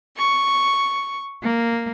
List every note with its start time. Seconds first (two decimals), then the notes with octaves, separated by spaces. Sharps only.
0.17 C#6
1.42 A#3